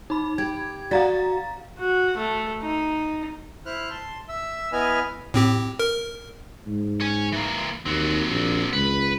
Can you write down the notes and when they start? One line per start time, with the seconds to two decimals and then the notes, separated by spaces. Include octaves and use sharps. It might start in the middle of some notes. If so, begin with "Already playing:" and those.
0.10 D#4 B5
0.38 G4 G#6
0.91 F#4 D5 F5 F#5 A#5 A6
1.79 F#4
2.17 A3
2.62 D#4
3.66 E4 C5 F6 F#6
3.91 A5 C6
4.28 E5 E6
4.72 B3 E4 B4 D#5 G#5 F6
5.34 A2 C4 G4
5.79 A#4
6.66 G#2
7.01 C#5 G#5
7.32 E3 A#3
7.86 D#2 C4 F#4
8.29 A#1
8.73 C#2 B4